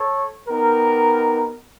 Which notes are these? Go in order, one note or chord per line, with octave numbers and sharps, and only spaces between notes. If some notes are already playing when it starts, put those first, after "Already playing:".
Already playing: A4 C#5
B3 D#4 G4 A#4